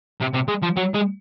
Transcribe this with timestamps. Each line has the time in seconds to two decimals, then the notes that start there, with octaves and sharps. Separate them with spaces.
0.21 C3
0.34 C3
0.49 G#3
0.63 F3
0.77 F#3
0.95 G#3